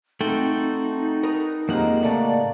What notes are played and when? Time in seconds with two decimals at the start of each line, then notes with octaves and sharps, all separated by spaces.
0.21 A3 C4 D#4 F#4 A4 G5 C6
1.23 A#4 B4 D#6
1.69 F2 F3 G#3 A#3 G4 D#5 F#5 A#5
2.03 A2 C#3 A3 D5 F5 A5 A#5